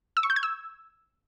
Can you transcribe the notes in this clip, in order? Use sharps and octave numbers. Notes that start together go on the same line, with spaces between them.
E6
C#6
G6
G#6
E6